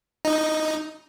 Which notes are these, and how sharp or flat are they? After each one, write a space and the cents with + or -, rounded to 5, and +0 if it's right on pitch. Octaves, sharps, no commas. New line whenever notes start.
D#4 +0 D#5 +0